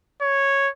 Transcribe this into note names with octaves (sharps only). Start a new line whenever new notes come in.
C#5